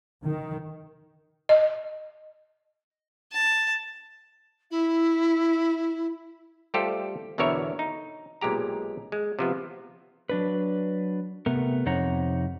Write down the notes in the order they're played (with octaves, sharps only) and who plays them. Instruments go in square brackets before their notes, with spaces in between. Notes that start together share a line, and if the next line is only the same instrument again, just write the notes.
[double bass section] D#3
[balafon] D#5
[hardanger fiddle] A5
[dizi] E4
[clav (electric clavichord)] G3 A3 F4 G4 A4 C5
E2 B2 D3 A#4 C#5 E5
D#4
B1 A#2 G#3 G4 A#5
G#3
C3 F3 B3
[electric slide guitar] F#3 D4 B4
C3 A3 B3 A#4
F2 C3 D#4 C#5 F#5 A#5